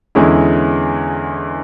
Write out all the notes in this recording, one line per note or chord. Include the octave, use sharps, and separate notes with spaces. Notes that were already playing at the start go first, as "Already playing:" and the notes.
E2 D3 G#3 C#4 E4